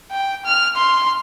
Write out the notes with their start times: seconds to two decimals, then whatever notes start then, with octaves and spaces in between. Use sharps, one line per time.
0.11 G5
0.45 F6
0.76 C6